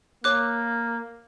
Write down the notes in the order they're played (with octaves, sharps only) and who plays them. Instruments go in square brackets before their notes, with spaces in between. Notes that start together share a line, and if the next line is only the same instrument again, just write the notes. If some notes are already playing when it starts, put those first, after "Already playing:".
[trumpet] A#3 [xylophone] C#5 D6 F#6